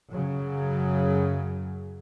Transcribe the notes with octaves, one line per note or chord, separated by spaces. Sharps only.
F#2 C#3 F#3